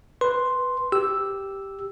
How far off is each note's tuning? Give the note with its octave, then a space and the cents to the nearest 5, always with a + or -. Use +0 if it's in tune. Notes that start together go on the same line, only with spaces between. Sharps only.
B4 +0 C6 +0
G4 +0 E6 +0